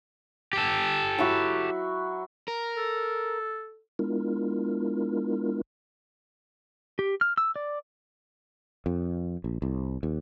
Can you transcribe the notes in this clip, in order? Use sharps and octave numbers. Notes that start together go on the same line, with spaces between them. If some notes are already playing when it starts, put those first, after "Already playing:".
G4 A4
F#3 E4 F#4
A#4
A4
G#3 B3 D4 E4 F4 A#4
G4
F6
E6
D5
F2
A#1
C2
D#2